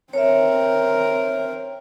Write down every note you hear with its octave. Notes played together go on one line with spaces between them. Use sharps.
C4 A#4 C#5 E5